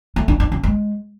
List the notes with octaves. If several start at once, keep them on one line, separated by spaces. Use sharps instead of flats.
A3
D4
D4
C#4
G#3